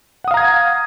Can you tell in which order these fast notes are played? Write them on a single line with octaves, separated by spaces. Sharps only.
F#5 D#6 F5 A#5 G#6